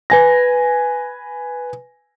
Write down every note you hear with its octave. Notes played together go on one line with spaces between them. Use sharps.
B4 G#5 A#6